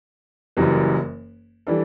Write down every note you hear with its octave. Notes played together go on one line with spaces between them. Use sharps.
F#1 F#2 E3 G3
E3 G3 D4 A4